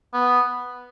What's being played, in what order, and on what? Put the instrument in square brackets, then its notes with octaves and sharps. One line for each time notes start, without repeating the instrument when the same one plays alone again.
[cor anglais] B3